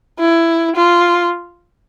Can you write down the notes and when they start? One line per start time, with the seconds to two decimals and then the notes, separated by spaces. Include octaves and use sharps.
0.19 E4
0.75 F4